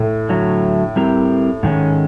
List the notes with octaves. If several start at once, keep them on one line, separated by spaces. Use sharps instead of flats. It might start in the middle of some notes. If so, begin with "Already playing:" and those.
Already playing: A2
D3 F#3 A3
G3 C4 E4 G4 A#4
G#2 D#3 G#3 C#4